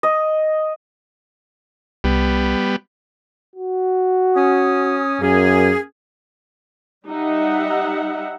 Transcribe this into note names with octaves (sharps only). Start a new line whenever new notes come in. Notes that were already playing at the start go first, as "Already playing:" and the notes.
D#5
C2 G3 B3
F#4
C#4 D#6
F#2 A#3 C#4 G#4
G3 D#4 E5 F#5